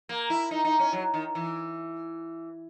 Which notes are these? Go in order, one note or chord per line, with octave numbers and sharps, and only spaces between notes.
A#3
E4
D#4
D#4
C#4
F#3
D#3
E3